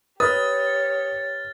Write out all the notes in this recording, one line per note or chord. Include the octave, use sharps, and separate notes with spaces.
G4 B4 C#5 D#6 F6 A6